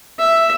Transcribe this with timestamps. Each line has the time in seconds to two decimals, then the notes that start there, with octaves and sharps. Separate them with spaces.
0.19 E5